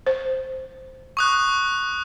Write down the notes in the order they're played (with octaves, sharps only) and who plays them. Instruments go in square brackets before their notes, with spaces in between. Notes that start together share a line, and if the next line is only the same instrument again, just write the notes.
[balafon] C5
[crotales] C#6 D#6 F#6